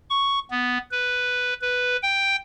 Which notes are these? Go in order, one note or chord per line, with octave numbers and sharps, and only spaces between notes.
C#6
B3
B4
B4
G5